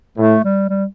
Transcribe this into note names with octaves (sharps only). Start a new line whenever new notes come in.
A2 A3
G3
G3